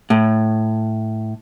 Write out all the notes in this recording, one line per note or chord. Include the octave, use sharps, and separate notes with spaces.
A2